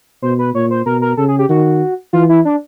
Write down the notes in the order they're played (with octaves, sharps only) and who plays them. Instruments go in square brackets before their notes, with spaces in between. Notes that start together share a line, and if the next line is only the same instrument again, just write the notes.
[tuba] B2 [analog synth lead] C5
[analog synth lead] B4
[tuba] A#2 [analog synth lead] C#5
[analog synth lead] C5
[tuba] B2 [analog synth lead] A#4
[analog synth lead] A#4
[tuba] C#3 [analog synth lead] A4
[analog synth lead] G#4
G4
[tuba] D#3 [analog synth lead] F#4
[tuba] E3 [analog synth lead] F4
[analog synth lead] E4
D4